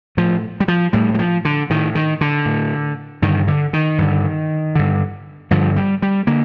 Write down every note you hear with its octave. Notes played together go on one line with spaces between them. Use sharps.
A2 F3
G3
F3
A2 G3
G3
F3
D3
A2 D#3
D#3
D3
A2
G2 D3 D#3
D3
D#3
G2 D3
G2 D3
G2 D3 F3
G3
G3
D3 A#3